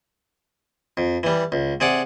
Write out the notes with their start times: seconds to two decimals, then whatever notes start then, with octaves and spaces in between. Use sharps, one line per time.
0.97 F2
1.23 E3 G3
1.52 C#2
1.80 C3 G#4 D5 F#5